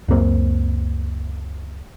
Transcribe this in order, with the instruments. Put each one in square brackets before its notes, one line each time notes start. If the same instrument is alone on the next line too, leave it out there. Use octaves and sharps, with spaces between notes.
[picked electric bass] C#2 F#2 A#3 C4